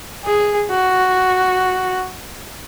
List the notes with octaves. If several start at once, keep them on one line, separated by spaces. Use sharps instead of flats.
G#4
F#4